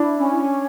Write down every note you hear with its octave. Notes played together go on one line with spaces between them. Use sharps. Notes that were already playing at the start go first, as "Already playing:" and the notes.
Already playing: D4 E4
C#4